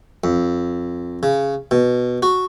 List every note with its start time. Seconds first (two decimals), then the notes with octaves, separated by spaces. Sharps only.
0.24 F2
1.23 C#3
1.71 B2
2.23 F#4